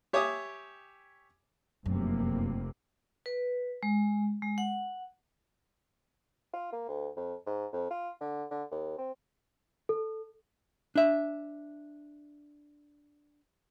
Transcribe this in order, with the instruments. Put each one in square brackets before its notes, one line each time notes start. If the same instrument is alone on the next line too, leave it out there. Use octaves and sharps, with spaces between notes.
[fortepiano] G4 C#5 E5 G#5 D6 D#6
[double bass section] F1 C3 A#3 [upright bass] F#2
[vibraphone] B4
G#3
G#3
F#5
[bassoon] F4
A#3
D2
F2
G#2
F2
F4
D3
D3
D#2
C4
[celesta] A4
[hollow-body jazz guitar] D4 E5